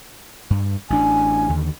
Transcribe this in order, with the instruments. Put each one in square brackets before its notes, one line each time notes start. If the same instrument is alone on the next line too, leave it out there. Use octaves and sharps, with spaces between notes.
[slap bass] G2
[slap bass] A1 D4 [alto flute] G#5
[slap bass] D#2 D3